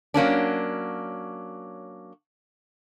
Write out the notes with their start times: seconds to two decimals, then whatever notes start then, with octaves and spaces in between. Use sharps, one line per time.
0.14 F#3 A#3 C#4 D4